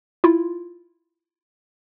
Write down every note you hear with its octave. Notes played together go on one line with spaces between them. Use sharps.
E4 F4